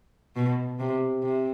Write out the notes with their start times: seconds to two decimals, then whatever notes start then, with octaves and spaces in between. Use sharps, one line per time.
0.36 B2
0.79 C3
1.23 C3